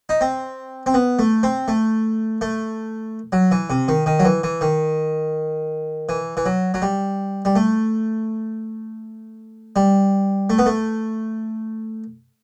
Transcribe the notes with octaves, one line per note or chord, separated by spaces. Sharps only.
D#4
C4
C4
B3
A3
C4
A3
A3
F#3
E3
C3
D#3
D#3
F#3
E3
E3
D#3
E3
E3
F#3
F#3
G3
G3
A3
G3
A3
B3
A3